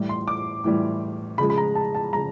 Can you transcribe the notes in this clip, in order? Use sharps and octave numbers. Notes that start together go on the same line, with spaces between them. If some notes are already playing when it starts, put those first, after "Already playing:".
Already playing: A2 E3 G3
C6
D6
A2 E3 G3
C#3 F3 G#3 B5
B5
A#5
A5
A5
C#3 F3 G#3 A#5